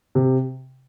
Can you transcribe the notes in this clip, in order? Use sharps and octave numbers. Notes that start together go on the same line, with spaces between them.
C3